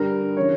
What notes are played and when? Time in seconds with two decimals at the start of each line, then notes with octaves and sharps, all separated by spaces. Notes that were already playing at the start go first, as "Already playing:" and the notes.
Already playing: G2 D3 G3 A#4
0.37 C#3 E3 C#5